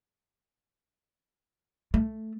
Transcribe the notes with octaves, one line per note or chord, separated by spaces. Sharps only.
A3